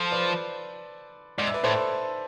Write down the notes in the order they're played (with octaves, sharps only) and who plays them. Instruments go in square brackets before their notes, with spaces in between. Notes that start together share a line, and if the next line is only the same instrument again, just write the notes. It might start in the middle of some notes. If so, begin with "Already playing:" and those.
Already playing: [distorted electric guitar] F3 [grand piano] A4 C5
[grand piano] B4 D5
[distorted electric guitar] G#2 [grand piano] D5
[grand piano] E5
B4 D5
[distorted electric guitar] A2 [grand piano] A4 C5